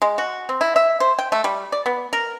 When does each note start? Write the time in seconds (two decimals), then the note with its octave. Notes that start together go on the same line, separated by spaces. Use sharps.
0.02 G#3
0.18 F#4
0.49 C4
0.61 E4
0.76 E5
1.00 C5
1.19 G5
1.32 A3
1.44 G3
1.72 D5
1.86 B3
2.13 A#4